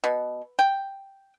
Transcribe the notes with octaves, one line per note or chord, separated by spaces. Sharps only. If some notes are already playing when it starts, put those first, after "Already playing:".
B2
G5